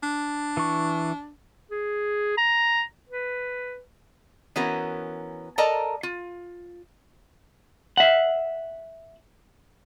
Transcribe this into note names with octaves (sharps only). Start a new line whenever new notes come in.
D4
E3 C#6
G#4
A#5
B4
E3 B3 C#4 F#4 A#4
A4 A#4 D5 D#5 A5 A#5
F4
E5 F#5